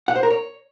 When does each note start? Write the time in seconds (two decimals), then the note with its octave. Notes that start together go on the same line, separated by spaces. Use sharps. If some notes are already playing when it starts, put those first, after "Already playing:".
0.08 F#5
0.16 C5
0.23 A#4
0.30 C#5